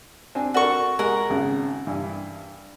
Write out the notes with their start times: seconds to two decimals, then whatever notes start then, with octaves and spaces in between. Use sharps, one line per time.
0.35 C4 D4 G#5
0.54 F#4 A4 A#4 D5 C#6
0.99 G#3 A#4 F#5
1.30 G#1 C#3
1.87 G2 E3